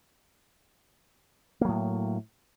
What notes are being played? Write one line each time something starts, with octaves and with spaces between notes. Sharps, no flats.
A2 F#3 A#3